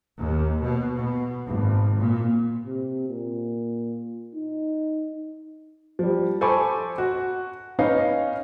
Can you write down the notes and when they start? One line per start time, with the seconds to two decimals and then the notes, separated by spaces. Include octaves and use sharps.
0.18 D#2
0.61 B2
0.94 B2
1.46 G#1
1.96 A#2
2.66 C3
3.09 A#2
4.35 D#4
5.99 F3 G3
6.41 A4 C5 G#5 B5 C#6 D6
6.98 F#4
7.79 C#4 D#4 B4 F5